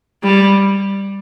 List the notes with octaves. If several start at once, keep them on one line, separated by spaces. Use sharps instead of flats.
G3